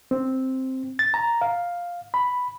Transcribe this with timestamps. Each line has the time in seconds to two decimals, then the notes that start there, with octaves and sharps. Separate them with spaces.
0.11 C4
0.99 A6
1.14 A#5
1.42 F5
2.14 B5